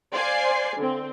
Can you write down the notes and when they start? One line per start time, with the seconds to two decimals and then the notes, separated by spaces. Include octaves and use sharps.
0.12 C5 D5 F5 G#5 C7
0.77 D3 C4